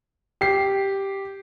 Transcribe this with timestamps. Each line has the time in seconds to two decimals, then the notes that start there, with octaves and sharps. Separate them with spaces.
0.41 G4 C7